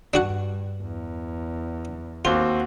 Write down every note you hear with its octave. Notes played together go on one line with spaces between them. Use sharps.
G2 D4 F#4 F#5
E2
D#2 C4 F4 F#4 G7